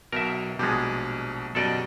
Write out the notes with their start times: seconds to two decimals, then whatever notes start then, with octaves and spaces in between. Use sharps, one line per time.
0.12 B1 B2 A#4 E5
0.59 A#1 B2 G3 G#3
1.55 F#2 B2 G3 A4 D5 D#5